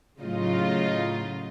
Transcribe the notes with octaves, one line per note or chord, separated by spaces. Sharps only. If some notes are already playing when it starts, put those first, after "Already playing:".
A2 C#3 F#3 D#4 F4 D#5